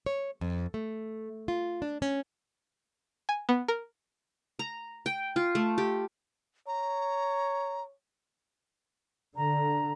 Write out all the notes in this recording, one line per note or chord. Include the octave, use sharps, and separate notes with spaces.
C#5
F2
A3
F4
D4
C#4
G#5
B3
A#4
A#5
G5
F4
A3
G4
C#5 A#5
D3 A#5